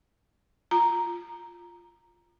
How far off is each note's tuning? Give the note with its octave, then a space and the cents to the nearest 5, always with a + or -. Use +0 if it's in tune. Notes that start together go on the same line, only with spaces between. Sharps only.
F4 +0 A#5 +0